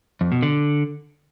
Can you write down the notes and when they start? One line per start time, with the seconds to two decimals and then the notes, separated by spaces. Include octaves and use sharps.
0.21 F2
0.32 B2
0.43 D3